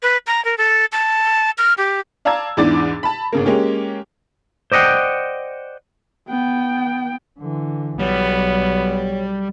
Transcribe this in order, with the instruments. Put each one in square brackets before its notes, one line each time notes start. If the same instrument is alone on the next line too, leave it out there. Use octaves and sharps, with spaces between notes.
[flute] B4
A#5
A#4
A4
A5
F6
G4
[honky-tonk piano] D5 F5 A5 A#5 E6 G#6
E2 G#2 E3 D4 D6 A6
A5 B5
G1 C#3 A#3
G#3 A#3 C#4 G4
[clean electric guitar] C5 D5 D#5 F#5 G5
[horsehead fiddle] B3 G5
[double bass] D3 E3
[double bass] B1 [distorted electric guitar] G3 [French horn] B3 [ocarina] C#5